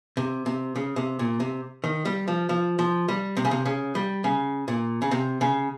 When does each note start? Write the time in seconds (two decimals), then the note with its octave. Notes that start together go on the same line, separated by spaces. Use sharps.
0.17 C3
0.46 C3
0.76 C#3
0.96 C3
1.19 A#2
1.40 C3
1.84 D#3
2.05 G3
2.28 F3
2.49 F3
2.79 F3
3.08 G3
3.37 C3
3.45 C#3
3.51 C3
3.66 C#3
3.95 G3
4.24 C#3
4.68 A#2
5.02 C#3
5.11 C3
5.41 C#3